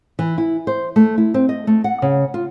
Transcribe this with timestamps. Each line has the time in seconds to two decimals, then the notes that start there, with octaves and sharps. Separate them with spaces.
0.19 E3
0.38 E4
0.67 C5
0.96 A3
1.18 E4
1.34 C4
1.49 D#5
1.67 A3
1.84 F#5
2.02 C#3
2.34 F4